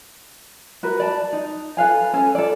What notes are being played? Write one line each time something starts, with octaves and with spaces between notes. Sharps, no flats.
F#4 A#4 B4
D5 A5
D#4
A4 B4 F5 G#5
C#4 A4 G#5
A4 D5